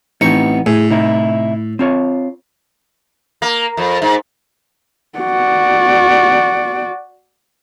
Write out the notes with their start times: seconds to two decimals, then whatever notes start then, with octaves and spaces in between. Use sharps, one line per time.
0.21 A1 B3 C4 D#4 C#6
0.66 A2 G#4
0.90 C3 D#4 E4
1.79 C4 F4 C#5
3.42 A#3
3.77 F2
4.02 G#2
5.19 F#4 D5